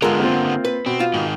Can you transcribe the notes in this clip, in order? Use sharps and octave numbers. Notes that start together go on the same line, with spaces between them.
D3 G#3 B3 F4 A#4 E5
A#3 C4 F4
B4
B2 C4
F4
G#2 D#3